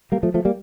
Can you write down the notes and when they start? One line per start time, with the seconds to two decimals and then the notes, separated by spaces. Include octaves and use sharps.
0.12 G3 A#3
0.23 F3 A3
0.34 F3 A3
0.45 G3 A#3